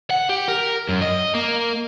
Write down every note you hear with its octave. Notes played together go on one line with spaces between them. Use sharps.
F#5
G4
A#4
F#2
D#5
A#3